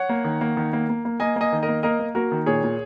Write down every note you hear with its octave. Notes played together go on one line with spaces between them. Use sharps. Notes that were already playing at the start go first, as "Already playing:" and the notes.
Already playing: C#5 F#5
A#3
D#3
A#3
D#3
A#3
A#3
A#3
A#3 D#5 G#5
A#3 D#5 G#5
D#3
A#4 D#5
A#3
A#3 A#4 D#5
A#3
A#3 F#4 A#4
D#3
A#2 G#4 C#5
A#2